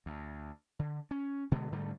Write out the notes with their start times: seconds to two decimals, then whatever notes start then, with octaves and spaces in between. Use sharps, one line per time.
0.06 D2
0.79 D3
1.11 C#4
1.51 B2 D3 G#3 B3
1.72 G#2 D3 G3 A3